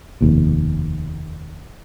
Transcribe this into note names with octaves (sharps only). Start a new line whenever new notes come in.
F1 D#2 B2